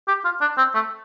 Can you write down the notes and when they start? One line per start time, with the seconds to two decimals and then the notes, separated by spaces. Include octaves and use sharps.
0.08 G4
0.25 F4
0.41 D4
0.58 C4
0.75 A3